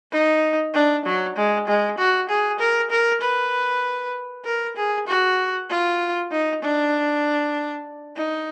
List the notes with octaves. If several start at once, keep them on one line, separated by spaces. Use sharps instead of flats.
D#4
D4
F#3
G#3
G#3
F#4
G#4
A#4
A#4
B4
A#4
G#4
F#4
F4
D#4
D4
D#4